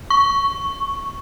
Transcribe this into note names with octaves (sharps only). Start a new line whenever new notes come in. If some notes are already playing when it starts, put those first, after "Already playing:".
C#6